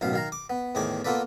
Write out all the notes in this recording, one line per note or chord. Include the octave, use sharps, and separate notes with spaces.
A1 F#2 B2 F5
D#3 F5 A#5
D6
B3
E2 A2 D#3 G#4 D6
A#3 B3 F4 A4 B4 D5